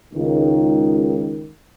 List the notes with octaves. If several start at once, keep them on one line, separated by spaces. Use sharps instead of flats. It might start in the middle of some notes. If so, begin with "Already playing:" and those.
C#2 D#3